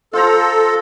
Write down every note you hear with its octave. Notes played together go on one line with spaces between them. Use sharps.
F4 A4 C5 A#5